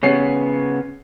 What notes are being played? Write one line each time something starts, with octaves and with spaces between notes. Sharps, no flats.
C#3 B3 C#4 C#5 C7